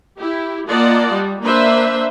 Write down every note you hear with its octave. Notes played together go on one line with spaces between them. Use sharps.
E4 G4
A#3 F4 D5 D#5 F#5 A5
G3
A#3 D4 B4 C5 E5